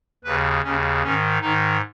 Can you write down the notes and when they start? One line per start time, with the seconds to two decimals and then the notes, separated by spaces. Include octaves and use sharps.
0.24 D#2 C#3 B4
0.63 D#2 C#3 C#4
1.03 G#2 D#3 C#4
1.41 G#2 D#3 D#4